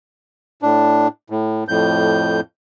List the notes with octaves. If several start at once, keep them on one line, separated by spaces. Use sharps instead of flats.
A2 D4
A2
F2 A2 G6